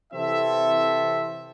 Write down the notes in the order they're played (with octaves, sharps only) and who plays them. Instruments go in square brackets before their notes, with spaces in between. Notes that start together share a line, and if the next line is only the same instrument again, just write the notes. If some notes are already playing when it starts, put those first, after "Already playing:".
[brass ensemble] C3 E3 C4 E4 A4 E5